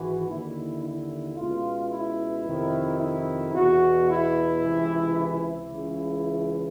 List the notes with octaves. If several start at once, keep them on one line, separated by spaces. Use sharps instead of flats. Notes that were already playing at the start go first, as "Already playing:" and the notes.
Already playing: G#1 G#2 E3 F#4
D#2 D3 E4
E4
C#2 B2 F4
E4
F2 C3 D#3
E4
E2 B2 F#4
E4
C#2 C3 E3
E4
C#2 C#3 E3